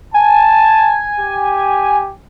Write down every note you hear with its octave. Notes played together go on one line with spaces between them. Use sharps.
G#5 A5
G4